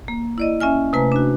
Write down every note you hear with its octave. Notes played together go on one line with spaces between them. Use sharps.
A#3
E4 D5 D#5
A#3 C#4 E5 G#5 F6
C3 A3 B4 G#5 A#5
D4 F#4